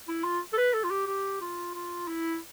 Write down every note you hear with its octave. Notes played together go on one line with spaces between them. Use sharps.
E4
F4
A4
B4
A4
F4
G4
G4
F4
F4
E4